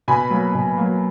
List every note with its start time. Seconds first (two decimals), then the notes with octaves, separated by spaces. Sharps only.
0.08 B2 G#5 B5
0.30 F#3 A#3
0.54 B2
0.78 F#3 A#3